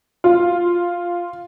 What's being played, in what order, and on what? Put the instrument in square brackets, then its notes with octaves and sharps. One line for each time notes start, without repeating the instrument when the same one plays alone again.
[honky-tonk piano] F4